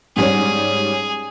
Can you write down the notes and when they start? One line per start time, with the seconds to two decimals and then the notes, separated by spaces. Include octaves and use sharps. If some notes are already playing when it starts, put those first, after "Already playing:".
0.16 G#2 G3 C#4 G#4